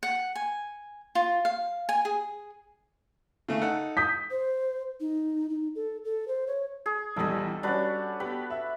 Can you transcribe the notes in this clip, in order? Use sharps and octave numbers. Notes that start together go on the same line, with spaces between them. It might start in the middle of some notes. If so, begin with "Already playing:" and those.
F#5
G#5
F4
F5
G#5
G#4
C#3 A3
D#4 A4 F#5
D#6 G6 B6
C5
D#4
D#4
A4
A4
C5
C#5
G#4
A#1 E2 G3 A4 D#5
G3 C#4 D4 F#4 B4
B3 G4 B4
E5